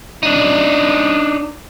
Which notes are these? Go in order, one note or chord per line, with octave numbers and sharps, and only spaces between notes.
D4 D#4